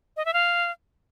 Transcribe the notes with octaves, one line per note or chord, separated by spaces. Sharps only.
D#5
E5
F5